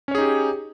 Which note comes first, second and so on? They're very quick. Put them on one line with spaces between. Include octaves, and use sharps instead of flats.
C#4 C#5 G#4 D#4 G4